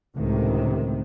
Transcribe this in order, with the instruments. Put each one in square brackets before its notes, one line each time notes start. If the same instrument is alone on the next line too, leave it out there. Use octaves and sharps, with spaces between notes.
[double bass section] C#2 A2 C3 D#3